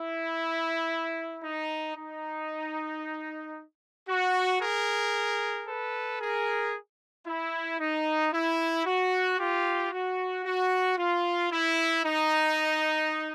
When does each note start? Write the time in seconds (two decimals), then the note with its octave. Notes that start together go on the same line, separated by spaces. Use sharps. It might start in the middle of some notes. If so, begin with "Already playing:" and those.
Already playing: E4
1.43 D#4
1.96 D#4
4.08 F#4
4.61 G#4 A#4
5.67 A4 B4
6.20 G#4 A#4
7.27 E4
7.80 D#4
8.32 E4
8.86 F#4
9.39 F4 G4
9.92 F#4
10.45 F#4
10.98 F4
11.52 E4
12.04 D#4